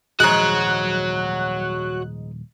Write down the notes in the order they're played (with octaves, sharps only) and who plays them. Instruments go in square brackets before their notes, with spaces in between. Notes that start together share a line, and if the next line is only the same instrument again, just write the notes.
[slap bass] D#1 F3 [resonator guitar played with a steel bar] G#2 G#3 [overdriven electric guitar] F#4 C#5 [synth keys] F#6